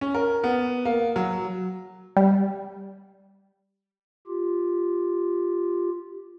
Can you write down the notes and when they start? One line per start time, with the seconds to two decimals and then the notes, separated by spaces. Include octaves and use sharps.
0.01 C#4
0.15 A#4
0.44 B3
0.85 A#3
1.16 F#3
2.17 G3
4.27 F4 G4